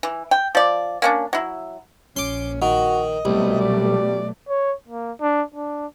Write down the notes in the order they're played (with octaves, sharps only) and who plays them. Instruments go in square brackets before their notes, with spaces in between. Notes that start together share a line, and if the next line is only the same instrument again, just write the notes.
[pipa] E3
G5
F3 D5
A#3 C#4 D4
F#3 E4
[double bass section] A#1 [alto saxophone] C#4 [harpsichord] C6 D6
[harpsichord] D#3 [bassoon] F#4 [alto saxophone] D#5
[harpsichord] C2 [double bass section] B2 F#3 A3 [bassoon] G3
[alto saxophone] D5
[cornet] C#5
A#3
D4
D4